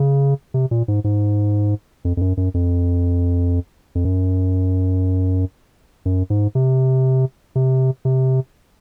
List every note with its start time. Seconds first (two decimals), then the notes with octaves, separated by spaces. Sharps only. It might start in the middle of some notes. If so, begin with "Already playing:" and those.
Already playing: C#3
0.54 C3
0.71 A#2
0.88 G#2
1.04 G#2
2.05 F2
2.17 F2
2.21 F#2
2.37 F#2
2.54 F2
3.95 F2
4.05 F#2
6.05 F#2
6.30 G#2
6.55 C3
7.55 C3
8.05 C3